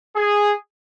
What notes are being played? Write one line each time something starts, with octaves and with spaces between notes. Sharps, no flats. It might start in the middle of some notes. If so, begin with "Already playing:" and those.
G#4